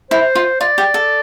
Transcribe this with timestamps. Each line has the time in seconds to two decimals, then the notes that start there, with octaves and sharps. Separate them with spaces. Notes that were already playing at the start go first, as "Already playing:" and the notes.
0.11 E4 C5
0.35 F4
0.61 F4 D5
0.78 G4
0.94 A4